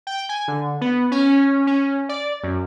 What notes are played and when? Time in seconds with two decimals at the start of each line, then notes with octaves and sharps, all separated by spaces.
0.07 G5
0.29 G#5
0.48 D3
0.81 B3
1.11 C#4
1.67 C#4
2.09 D5
2.43 F#2